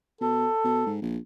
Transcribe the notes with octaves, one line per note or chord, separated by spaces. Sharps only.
B2 A4
B2
G#2
A#1